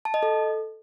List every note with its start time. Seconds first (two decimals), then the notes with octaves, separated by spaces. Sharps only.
0.05 A5
0.14 D#5
0.23 A4